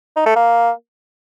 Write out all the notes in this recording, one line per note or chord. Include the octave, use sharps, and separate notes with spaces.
D#4
A3
A#3